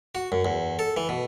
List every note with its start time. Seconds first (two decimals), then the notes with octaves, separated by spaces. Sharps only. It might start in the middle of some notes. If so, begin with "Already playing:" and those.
0.15 F#4
0.32 F#2
0.45 E2
0.79 A4
0.97 E3
1.09 B2